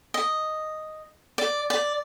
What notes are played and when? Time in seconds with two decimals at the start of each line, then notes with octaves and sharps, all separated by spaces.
0.14 D#5
1.38 D5
1.70 D5